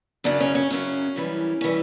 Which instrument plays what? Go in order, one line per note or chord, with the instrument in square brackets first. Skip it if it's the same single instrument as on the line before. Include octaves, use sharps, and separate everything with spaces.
[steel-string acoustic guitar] F#2 C#3 F#3 D4
C#4
C#4
F#2 C#3 F#3 C#4
F#2 E3 G3
E3 G3 C#4